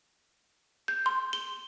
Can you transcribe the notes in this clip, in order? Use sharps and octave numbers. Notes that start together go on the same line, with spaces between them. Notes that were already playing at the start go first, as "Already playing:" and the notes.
G6
C6
G7